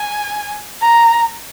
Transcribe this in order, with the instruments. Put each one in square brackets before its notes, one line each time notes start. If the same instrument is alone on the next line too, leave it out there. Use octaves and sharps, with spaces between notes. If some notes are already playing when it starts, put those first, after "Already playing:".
Already playing: [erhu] G#5
A#5